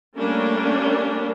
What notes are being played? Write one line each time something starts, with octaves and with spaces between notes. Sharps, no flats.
G3 A3 A#3 C#4 D4 A#4